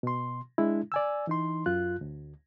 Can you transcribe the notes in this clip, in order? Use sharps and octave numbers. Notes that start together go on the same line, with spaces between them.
B2 C6
G#3 D4 E4
D5 G#5 E6
E3 D#4 C6
F#2 F4 F#6
D2